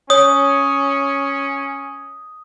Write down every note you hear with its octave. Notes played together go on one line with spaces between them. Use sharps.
C#4 C#5 D#6